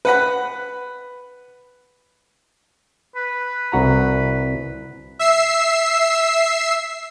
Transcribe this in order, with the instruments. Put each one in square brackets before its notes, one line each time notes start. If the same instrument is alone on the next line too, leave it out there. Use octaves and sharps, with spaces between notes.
[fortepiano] B4 F#5 B5
[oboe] B4
[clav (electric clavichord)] C2 F#4 A#5
[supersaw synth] E5 E6 C7